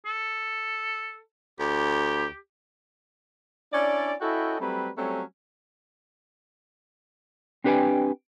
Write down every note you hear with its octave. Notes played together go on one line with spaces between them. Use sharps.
A4
D2 G4
C#4 D4 E4 D5
C#4 E4 F#4 A4 D#5 G5
F#3 G3 A3 C4 B4 B5
F#3 G3 A3 C4 C#4
C4 D4 G4 B4 G5 G#5